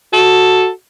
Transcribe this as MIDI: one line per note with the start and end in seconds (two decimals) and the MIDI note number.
0.13 0.70 66
0.13 0.69 69